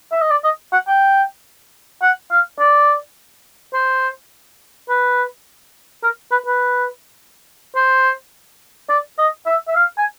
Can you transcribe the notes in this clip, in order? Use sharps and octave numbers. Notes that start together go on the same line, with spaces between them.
E5
D#5
D5
D#5
F#5
G5
F#5
F5
D5
C5
B4
A#4
B4
B4
C5
D5
D#5
E5
E5
F5
G#5